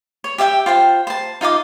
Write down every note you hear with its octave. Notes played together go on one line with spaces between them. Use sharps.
C#5
G4 E5 F5 G5
F4 C5 G5
C5 A5
D#4 F4 D#5 D6